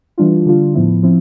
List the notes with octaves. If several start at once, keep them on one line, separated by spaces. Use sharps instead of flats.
E3 G3 D4 F4
D3 G3 D4 F4
A2 F3 B3 E4
F3 C4 E4